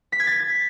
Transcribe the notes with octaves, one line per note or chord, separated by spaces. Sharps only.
B6
G#6
A6